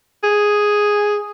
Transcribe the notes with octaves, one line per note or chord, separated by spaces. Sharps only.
G#4